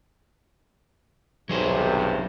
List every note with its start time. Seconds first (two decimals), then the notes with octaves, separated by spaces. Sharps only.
1.49 B1 G2 C3 F#3 G#4 C5